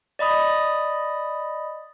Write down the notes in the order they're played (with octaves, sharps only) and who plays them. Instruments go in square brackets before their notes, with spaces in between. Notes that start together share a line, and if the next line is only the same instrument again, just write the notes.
[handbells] D5 D#5 B5 D#6